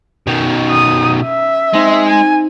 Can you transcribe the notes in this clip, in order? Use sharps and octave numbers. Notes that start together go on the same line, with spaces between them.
B2 D#3 C#4
D#6
E5
G#3 C4 D#4
G#5